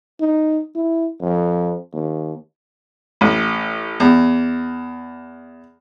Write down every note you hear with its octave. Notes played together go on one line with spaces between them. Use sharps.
D#4
E4
F2
D#2
A1
E2